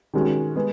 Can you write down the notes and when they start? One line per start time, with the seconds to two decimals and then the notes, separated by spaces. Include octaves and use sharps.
0.14 D#3 G#3 C#4 F#4
0.56 G#3 B3 G#4